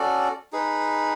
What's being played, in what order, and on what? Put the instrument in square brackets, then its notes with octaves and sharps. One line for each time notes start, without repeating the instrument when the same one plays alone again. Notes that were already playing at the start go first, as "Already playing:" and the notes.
Already playing: [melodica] C#4 F#4 A4 D5
D#4 G#4 B4